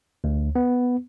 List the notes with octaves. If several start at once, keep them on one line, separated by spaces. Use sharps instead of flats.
D2
B3